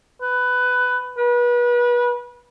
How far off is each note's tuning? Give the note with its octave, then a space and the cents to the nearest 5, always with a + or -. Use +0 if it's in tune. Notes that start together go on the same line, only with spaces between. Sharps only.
B4 +15
B4 -30